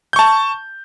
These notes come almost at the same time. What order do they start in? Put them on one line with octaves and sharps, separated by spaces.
G6 C#6 A5